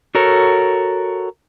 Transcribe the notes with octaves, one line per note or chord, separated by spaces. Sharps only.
F#4 A4 A#4 C#5